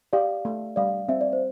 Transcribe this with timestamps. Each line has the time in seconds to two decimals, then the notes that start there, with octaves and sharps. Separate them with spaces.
0.13 G4 D5 F5
0.45 A3
0.76 G3 D5 F5
1.09 C4 E5
1.21 D5
1.33 C5